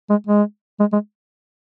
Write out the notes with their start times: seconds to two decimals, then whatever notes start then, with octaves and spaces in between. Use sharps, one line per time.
0.10 G#3
0.27 G#3
0.80 G#3
0.93 G#3